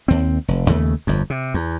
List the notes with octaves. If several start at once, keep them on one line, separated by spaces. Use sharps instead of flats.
D#2 C4
F1
D#2 C#3 A3
G1 F2
C3
E2